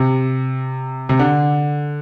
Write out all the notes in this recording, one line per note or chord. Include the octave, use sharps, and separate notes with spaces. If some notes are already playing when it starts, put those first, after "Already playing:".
Already playing: C3
C3
D3